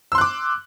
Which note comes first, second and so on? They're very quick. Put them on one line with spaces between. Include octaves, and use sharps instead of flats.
E6 C6 F#6 D6